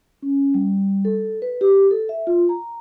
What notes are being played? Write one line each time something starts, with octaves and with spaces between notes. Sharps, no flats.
C#4
G3
A4
B4
G4
A4
E5
F4
A#5